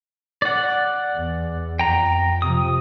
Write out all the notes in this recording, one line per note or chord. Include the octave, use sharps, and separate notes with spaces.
D5 F#5
E2
F2 G5 A#5
C3 F3 D#6